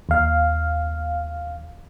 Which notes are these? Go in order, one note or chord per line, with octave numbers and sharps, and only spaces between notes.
D#2 F5